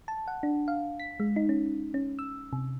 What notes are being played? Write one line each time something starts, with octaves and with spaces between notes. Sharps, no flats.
A5
F#5
D4
F5
B6
G#3
D#4
C#4
C#4
E6
C3